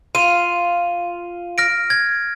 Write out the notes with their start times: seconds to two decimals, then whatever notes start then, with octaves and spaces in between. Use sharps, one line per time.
0.15 F4 D#7
1.58 F6 A#6 D7
1.90 G#6